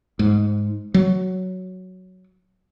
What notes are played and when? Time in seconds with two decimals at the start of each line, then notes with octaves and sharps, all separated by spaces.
0.19 G#2
0.94 F#3